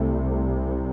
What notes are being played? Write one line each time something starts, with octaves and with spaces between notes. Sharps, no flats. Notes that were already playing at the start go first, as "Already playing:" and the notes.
Already playing: C2 C3 A3